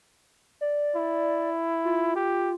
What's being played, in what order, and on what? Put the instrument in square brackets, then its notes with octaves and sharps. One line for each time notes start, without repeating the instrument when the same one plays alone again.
[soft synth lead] D5
[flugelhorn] E4
[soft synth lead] F4
[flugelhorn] G4